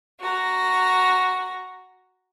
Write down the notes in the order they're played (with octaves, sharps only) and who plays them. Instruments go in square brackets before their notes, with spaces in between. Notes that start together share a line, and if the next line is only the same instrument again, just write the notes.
[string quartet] F#4 A#5